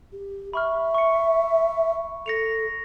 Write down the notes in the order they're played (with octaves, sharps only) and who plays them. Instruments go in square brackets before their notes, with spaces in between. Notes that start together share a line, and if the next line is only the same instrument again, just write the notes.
[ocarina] G4
[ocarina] E5 [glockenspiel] B5 C#6 F6
[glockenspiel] C#6 C#7
[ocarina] A4 [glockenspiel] A#6 C#7 F7